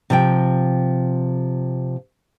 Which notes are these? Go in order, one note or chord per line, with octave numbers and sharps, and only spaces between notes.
C3 F3 G5